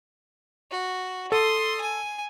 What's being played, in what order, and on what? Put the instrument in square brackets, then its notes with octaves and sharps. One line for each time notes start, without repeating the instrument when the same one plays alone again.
[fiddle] F#4
[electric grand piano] A4 [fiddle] C6 D#6
[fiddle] G#5